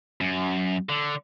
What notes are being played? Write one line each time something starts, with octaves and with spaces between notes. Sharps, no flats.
F#2
D3